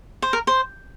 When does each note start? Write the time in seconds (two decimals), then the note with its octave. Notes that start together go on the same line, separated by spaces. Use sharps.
0.22 C5
0.33 A#4
0.47 C5